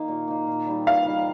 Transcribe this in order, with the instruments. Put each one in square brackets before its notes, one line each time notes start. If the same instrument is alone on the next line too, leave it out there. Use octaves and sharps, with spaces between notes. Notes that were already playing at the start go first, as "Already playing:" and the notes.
Already playing: [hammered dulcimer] D#3 A#3 D#4
A#2
A#3 D#4
A#2
G3 D#4
[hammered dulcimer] A#2 [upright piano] F5
[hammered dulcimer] G3 D#4